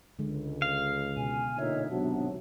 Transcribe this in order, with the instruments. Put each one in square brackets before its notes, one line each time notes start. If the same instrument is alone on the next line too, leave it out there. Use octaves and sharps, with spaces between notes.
[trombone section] C#2 [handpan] D3 G#3
[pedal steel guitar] F5
[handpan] B2 [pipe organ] G#5
[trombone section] A#2 D3 D#4 [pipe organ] C#5 [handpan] E5
[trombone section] G#1 C3 F#3 [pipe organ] B3 D4 [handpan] F#4